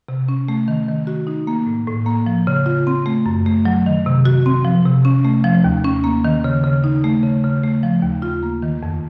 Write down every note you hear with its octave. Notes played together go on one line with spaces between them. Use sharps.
C3
C#4
A3
D#3
D#3
F#4
D#4
A#3
A2
A2
A#3
F3
C#3
F4
C4
A3
F#2
A3
F#3
D#3
C3
F#4
C4
F3
C3
C#4
A3
F3
D#2
C#4
A#3
D#3
C#3
C#3
D#4
A3
C#3
C#3
A3
F3
D#2
F4
A#3
D#3
F2